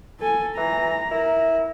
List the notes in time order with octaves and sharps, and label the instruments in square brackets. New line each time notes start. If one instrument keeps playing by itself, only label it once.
[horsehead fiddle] A4 G#5
[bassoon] E3 [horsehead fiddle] A#5
[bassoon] E4 [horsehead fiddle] A#4